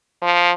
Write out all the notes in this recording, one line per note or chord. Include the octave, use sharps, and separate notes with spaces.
F3